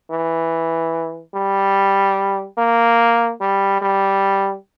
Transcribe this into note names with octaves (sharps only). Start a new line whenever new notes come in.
E3
G3
A#3
G3
G3